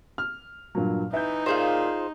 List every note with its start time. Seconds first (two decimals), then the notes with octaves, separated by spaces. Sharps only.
0.18 F6
0.75 G2 A#2 F#3
1.13 E3 D#4 E5 G6
1.46 A#2 F4 G#4 C5